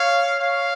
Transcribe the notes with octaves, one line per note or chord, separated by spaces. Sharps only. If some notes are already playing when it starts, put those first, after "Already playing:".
Already playing: C#5 F5
C#5 F5